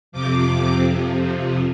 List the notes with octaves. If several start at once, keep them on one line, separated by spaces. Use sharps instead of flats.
F2 C3 F3 D6